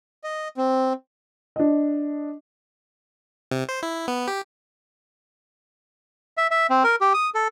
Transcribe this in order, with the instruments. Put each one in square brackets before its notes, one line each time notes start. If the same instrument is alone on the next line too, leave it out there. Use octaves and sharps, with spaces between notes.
[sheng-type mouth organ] D#5
C4
[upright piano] D4 D#5
[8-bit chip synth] C3
C5
E4
B3
G4
[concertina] E5
E5
C4
A#4
G4
D#6
A4